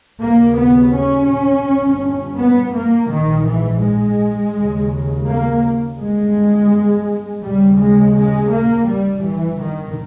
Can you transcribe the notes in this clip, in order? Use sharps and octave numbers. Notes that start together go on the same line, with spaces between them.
D#2 C#3 A#3
B3
C#4
G1 G2
B3
A#3
A#1 G#2 D#3
E3
G#3
D#2 C#3
A#3
G1 G2 G#3
D#2 C#3 G3
G#3
G#3
A#3
G1 G2 G3
E3
D#3